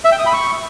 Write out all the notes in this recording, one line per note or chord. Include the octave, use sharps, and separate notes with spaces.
E5
G5
D#6
B5
C#6